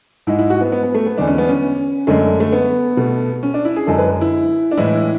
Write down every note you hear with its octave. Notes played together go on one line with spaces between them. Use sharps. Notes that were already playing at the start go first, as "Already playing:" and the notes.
G#2 G#3 E4
E4
F#4
B3
B3
B3
A3
B3
E2 D3 G#3 D4
C#4
B3
C#4
F#2 D3 G#3 A3
A3
B3
B2 A3
C#4
D4
E4
G#4
F#2 D3 G#3 A4
B4
E4
D4
A2 E3 G#3 E4